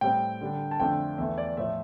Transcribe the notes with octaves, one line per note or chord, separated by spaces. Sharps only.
A2 G3 C4 G5
D3 G3 D4
A5
F2 D3 F3 A3 D4 G5
E2 E3 A3 E5
D5
A2 F3 A3 E5